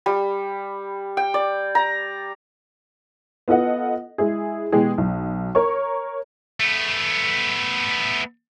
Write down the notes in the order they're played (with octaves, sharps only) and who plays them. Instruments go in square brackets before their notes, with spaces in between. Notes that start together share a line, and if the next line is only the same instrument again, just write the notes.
[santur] G3
G5
D5
A#5
[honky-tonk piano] B3 F4 A4 D#5 F#5
G#3 E4 G#4
B2 E3 G#3 G4 G#4
B1
A#4 C#5 C#6
[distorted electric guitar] A3 B3